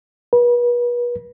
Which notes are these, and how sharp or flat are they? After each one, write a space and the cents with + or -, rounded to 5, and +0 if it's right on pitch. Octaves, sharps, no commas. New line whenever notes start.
B4 -35